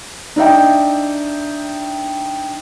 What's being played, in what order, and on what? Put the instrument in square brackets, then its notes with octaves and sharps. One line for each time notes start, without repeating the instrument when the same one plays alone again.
[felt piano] D4 D#4 E5 G5